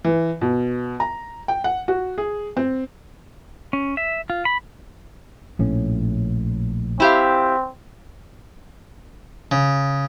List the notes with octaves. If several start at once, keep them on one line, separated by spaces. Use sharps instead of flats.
E3
B2
A#5
G5
F#5
F#4
G#4
C4
C#4
E5
F4
B5
A#1 A2 C#4
C4 E4 G4 F5
C#3